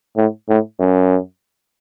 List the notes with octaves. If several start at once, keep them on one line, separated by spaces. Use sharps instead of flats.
A2
A2
F#2